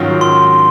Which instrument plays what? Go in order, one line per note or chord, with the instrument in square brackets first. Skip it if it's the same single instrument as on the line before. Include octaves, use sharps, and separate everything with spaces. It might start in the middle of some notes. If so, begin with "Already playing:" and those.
Already playing: [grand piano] G#2 D#3 F#3 C#4 F4
[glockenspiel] C6